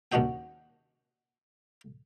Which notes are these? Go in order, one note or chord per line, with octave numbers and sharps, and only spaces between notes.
D#2 C#4 D4 F#4 D#5 G5